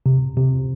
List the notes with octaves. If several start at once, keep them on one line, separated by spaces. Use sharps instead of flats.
C3
C3